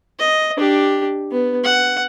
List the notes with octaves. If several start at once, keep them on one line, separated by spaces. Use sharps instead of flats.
D#5
D4 G4
B3
F#5